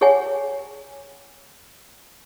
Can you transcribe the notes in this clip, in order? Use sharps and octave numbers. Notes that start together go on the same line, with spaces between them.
G4 G#4 C#5 F#5 G#5